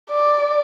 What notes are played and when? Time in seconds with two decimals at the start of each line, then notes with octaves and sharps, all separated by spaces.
0.11 D5